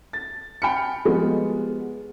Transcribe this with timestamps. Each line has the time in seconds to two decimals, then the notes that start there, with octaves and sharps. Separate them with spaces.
0.13 A6
0.62 G5 B5 F6 C#7
1.05 F3 G3 G#3 B3 F#4 G#4